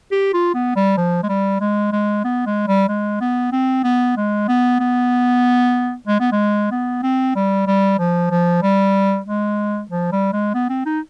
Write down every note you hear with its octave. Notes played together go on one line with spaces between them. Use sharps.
G4
F4
B3
G3
F3
G#3
G3
G#3
G#3
B3
G#3
G3
G#3
B3
C4
B3
G#3
B3
B3
G#3
B3
G#3
B3
C4
G3
G3
F3
F3
G3
G#3
F3
G3
G#3
B3
C4
D#4